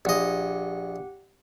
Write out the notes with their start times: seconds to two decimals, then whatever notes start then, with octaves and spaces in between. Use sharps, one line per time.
0.05 A#1 G4 D#5 F#5